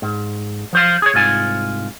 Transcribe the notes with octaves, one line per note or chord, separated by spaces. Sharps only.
G#2
F3 C5 F5
G#4 C#5
C2 G#2 F4 G#5